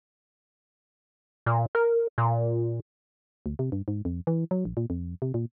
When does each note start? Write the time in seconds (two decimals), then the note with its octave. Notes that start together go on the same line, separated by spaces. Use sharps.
1.46 A#2
1.75 A#4
2.18 A#2
3.46 D2
3.59 C3
3.72 G2
3.88 G#2
4.05 F2
4.27 E3
4.51 F#3
4.65 A#1
4.77 A#2
4.90 F2
5.22 C3
5.34 A#2